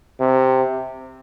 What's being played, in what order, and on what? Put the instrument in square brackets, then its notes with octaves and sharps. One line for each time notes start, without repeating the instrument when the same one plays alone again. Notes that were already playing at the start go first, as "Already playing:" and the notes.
[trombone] C3